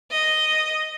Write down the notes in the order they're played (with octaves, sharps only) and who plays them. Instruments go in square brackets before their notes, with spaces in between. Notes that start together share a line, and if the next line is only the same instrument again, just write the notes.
[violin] D#5